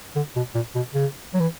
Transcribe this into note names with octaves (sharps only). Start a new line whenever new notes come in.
D3
B2
A#2
B2
C#3
F#3
E3